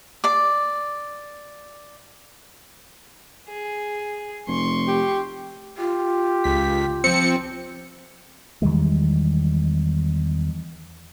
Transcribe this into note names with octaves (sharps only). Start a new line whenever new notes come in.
D5 D6
G#4
F1 C6 C#6
G4
F4 G4
C#2 B6
F3 C4 C#7
E2 D#3 G3 G#3